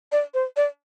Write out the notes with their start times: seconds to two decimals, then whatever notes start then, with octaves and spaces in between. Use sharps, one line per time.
0.12 D5
0.34 C5
0.57 D5